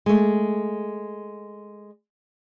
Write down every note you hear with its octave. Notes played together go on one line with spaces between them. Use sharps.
G#3 A3